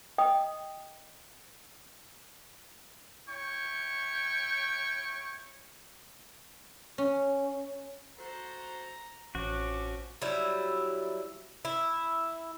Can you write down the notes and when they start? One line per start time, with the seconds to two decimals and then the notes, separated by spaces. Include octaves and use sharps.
0.18 D#5 G5 D#6
3.29 E4 C#5 G5 C#6
6.98 C#4
8.19 F#4 A4 C5 A#5
9.35 A1 F3 C4 C#4 F#4 D6
10.22 F#3 G3 E4
11.65 E4